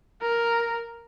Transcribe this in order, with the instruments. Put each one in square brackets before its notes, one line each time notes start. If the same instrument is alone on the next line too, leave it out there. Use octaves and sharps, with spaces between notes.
[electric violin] A#4